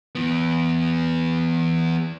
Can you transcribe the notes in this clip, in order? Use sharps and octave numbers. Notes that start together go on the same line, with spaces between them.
E3 B3